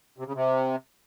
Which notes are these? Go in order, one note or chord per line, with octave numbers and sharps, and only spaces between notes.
C3
C#3
C3